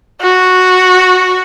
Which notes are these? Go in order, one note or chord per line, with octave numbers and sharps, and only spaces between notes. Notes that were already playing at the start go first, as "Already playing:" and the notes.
F#4